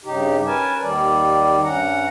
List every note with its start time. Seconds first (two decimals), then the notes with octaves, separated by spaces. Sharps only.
0.05 G2 C#3 D#4 G4
0.46 C#4 A#4 B4 G#5 A5
0.83 D#2 D#3 G3 D5
1.64 G2 C#4 F#5 A#5